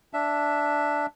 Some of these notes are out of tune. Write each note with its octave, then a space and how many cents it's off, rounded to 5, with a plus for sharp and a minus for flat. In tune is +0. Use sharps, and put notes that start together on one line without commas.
D4 +0 E5 +5